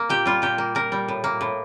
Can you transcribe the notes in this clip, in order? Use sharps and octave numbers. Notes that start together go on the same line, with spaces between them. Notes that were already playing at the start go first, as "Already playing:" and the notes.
Already playing: A#3
A#2 G4
G3 F4
A#2 G4
A#3
A#2 A#4
G3
A2
A#3
A2